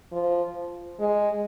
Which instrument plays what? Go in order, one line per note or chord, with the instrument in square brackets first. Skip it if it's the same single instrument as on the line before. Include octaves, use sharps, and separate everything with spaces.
[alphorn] F3
G#3